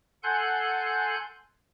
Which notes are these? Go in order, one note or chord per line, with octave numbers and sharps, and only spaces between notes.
A4 F#5 G#5 C6 F#6 G6